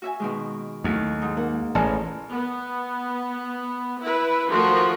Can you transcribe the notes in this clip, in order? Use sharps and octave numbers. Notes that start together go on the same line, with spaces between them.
F#4 E5 G#5
B2 D#3 G#3
D#2 F#3 A3 E4
G#2 D#4
A#3 F#5
A1 G#4 A#4 D5 G#5 A5
B3
E4 B4
D#3 F3 A3 F#4 A#4